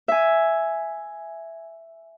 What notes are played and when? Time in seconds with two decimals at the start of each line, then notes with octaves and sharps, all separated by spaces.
0.08 E5 G#5